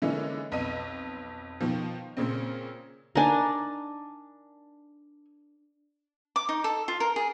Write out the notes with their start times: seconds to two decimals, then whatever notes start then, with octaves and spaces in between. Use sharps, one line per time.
0.02 D3 E3 G#3 A#3 C#4 D#4
0.52 B1 F2 B4 D#5 D#7
1.61 B2 D#3 F3
2.17 A#2 C#3 C4
3.15 D4 D#4 A#4 G#5
6.36 D6
6.49 D#4
6.64 A4
6.88 F4
7.00 A#4
7.16 G#4